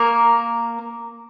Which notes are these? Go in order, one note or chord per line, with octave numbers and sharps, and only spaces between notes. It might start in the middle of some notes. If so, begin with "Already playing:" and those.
Already playing: A#3 A#4